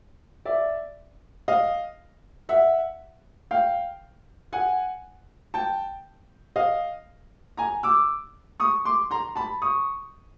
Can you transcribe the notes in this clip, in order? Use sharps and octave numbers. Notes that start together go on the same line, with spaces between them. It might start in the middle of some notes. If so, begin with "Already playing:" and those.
D5 E5
D#5 F5
E5 F#5
F5 G5
F#5 G#5
G5 A5
D#5 F5
G#5 A#5
D6 E6
C#6 D#6
C6 D6
A#5 C6
A5 B5
C#6 D#6